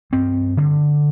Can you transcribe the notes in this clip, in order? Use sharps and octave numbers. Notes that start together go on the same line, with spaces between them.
G2 C4
D3